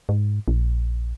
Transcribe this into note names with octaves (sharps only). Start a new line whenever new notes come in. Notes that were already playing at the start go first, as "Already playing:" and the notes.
G#2
A#1